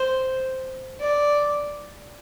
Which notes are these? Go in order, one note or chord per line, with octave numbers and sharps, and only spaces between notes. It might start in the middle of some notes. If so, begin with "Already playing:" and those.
Already playing: C5
D5